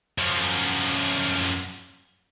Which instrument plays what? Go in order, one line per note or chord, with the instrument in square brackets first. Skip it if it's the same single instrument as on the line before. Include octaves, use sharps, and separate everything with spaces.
[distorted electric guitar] F#2 F3